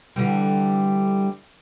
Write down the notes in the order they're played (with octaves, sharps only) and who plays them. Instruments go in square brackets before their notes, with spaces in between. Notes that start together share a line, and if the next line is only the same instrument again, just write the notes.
[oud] D3 E3 G3